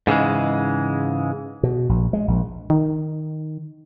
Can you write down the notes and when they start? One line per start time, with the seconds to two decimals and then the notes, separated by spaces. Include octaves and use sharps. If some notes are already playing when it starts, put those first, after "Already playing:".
0.07 G#2 C#3 E3 G#3
1.63 B2
1.89 A#1
2.13 G#3
2.28 A#1
2.70 D#3